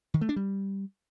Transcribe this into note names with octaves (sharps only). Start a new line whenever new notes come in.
D#3
A3
D4
G3